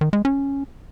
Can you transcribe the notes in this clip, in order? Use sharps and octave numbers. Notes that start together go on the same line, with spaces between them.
D#3
G#3
C#4